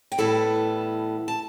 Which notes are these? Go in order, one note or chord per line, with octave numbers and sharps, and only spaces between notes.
G5
A2 E3 G3 B3 E4 A4 A5
A5